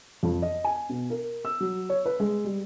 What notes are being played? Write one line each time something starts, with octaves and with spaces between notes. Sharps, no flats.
F2
D#5
G#5
B2
A#4
E6
F#3
C#5
B4
G#3
G3